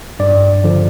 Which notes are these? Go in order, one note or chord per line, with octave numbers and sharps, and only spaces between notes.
G2 D5
D3 F3